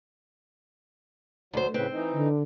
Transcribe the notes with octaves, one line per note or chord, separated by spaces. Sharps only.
D2 F#3 C5
A2 C#3 C4 B4
E3 D#4
D3